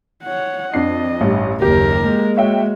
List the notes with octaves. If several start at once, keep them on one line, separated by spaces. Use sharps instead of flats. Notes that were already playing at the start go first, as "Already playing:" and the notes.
C#5 F#5
F2 D4 D#5 C7
A1 G2
F#1 D#2 G4 A#4
G#3 A#3
F#4 C#5 E5 G5